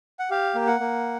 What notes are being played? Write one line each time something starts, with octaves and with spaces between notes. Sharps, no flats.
F#5
G4 F5
A#3
F#5
A#3